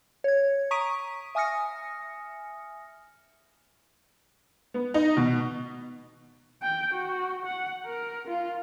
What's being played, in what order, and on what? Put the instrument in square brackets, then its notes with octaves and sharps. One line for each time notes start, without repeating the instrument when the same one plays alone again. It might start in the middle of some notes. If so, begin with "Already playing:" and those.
[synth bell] C#5 G#6
A#5 C#6 D#6 B6 D7 D#7
E5 G#5 D#6 F6 A#6 C#7
[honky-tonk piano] B3
D#4
B2
[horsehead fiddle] G5
F#4
F#5
A#4
F4